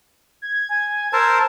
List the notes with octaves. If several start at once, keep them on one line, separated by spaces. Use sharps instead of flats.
G#6
G#5
A#4 C5 A5 E6